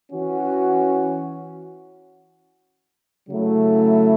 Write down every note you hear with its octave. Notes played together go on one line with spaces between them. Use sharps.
E3 C#4 F#4
C#3 F#3 A3 E4